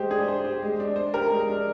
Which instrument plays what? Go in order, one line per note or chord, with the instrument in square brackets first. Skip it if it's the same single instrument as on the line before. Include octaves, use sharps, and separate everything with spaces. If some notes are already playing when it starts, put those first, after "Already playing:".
Already playing: [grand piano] G#3 [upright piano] G4 C5
[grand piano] D4 [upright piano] G#4
[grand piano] C5
G4
G#3
D4
C5
[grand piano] G4 [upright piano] A#4
[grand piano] G#3
D4